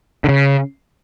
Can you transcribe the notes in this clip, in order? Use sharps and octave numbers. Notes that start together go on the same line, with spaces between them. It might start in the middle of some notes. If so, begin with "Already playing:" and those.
D3
C#3